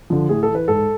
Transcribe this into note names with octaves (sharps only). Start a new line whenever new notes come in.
D3 F3
A2 G#4
A4
E3
B4
G#2 A4